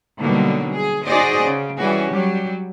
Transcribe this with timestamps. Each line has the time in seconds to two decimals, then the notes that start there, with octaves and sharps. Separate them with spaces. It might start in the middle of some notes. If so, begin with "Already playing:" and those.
0.19 B2 D3 F#3 G3 A#3 D#4
0.73 G#4
1.07 D#4 F#4 G#4 C5 D5 D#5
1.42 C#3
1.77 E3 G3 C#4 F#4 G#4
2.11 F#3 G3 G4